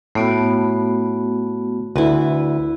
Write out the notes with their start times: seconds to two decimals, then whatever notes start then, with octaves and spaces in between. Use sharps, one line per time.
0.15 A2 A3 B3 F#4
1.96 D2 E4 B4